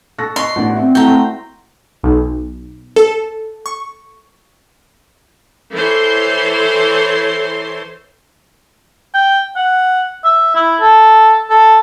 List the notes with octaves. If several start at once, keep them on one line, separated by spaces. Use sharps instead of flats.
A4 C#6 F#6 A#6
D#5 C6 C#6
A1 B3 D4 F#4 D5
C4 E5
A3 E4 F#4 G5 A#5
A3 C5
B1
A4
C#6
E3 A4 C5 C#5 C6
G5
F#5
E5
E4
A4
A4